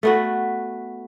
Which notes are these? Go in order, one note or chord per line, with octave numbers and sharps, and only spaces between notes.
A3 B3 F#4